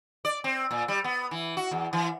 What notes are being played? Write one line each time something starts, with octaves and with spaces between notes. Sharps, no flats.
D5
C4
A#2
G3
B3
E3
F#4
E2
E3